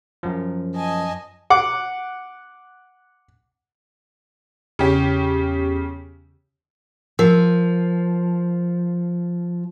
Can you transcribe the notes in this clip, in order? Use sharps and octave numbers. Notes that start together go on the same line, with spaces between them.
F#2 F3
D#5 G#5 A5
F#5 D6
E2 C#3 C#4 G4 B6
F3 A#4